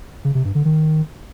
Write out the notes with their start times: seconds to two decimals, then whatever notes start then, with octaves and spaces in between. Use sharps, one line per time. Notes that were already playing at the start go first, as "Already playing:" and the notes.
0.25 C#3
0.35 C3
0.45 G2
0.55 D3
0.65 D#3